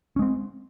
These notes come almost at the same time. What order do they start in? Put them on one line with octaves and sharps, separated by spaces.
C#4 G#3 C4